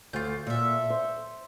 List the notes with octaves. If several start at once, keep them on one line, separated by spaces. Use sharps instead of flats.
D2 F4 G6
A#2 A4 E5
C5